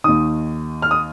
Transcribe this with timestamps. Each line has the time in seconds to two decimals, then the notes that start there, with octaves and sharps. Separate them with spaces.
0.04 D#2 D#3 D#6
0.82 F6
0.91 D#6